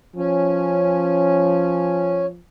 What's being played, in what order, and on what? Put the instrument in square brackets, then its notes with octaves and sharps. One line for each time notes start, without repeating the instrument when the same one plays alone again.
[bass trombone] F3 [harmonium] C#4